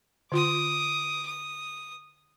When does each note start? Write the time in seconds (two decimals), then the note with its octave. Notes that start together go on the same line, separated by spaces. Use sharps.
0.32 D3 F4 C6 D6 D#6
1.26 D#6